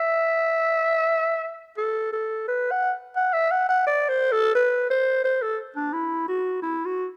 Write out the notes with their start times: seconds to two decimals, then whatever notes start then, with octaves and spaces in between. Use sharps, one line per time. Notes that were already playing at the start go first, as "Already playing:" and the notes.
Already playing: E5
1.78 A4
2.13 A4
2.48 B4
2.71 F#5
3.16 F#5
3.33 E5
3.51 F#5
3.69 F#5
3.86 D5
4.09 C5
4.32 A4
4.55 B4
4.90 C5
5.24 C5
5.42 A4
5.76 D4
5.93 E4
6.28 F#4
6.62 E4
6.85 F#4